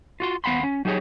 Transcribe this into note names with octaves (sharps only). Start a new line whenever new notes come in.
F4 F#4 C6
D#2 B3 F5 F#5 B5 C6
C#4
F#3 D#4 G4 G#4 C#5